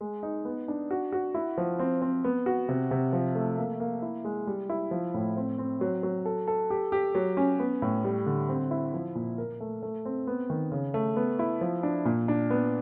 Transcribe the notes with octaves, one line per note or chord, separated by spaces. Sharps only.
G#3
D#4
B3
D4
F#4
F#4
E4
F3
C4
C4
B3
F#4
C3
C3
F3
A3
A#3
A#3
E4
G#3
G3
E4
F3
A2
C4
C4
F#3
F#3
A4
A4
G4
G4
F#3
C#4
B3
A2
G3
D3
C4
E4
F3
A#2
A#4
A3
A3
C4
B3
D#3
C#3
A3
B3
E4
F3
D4
A#2
D4
B3